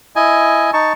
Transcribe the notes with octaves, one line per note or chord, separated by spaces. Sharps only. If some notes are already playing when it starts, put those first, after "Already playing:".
E4 D#5 G#5
D#4 A5 C#6